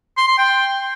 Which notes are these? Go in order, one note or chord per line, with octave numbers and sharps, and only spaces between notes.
C6
C6
G5